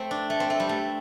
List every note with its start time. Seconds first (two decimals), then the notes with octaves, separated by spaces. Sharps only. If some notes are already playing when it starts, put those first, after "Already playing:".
Already playing: A3 C4
0.11 D4
0.30 A3
0.40 C4
0.50 A3
0.60 G3
0.69 A3